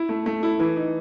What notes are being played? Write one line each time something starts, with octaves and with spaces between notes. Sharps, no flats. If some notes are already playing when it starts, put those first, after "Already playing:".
Already playing: E4
A3
A3
E4
E3
D#4